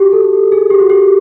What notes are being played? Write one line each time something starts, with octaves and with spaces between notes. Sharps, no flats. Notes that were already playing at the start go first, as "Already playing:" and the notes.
Already playing: F#4 G4
A4
G#4
G4
F#4
G4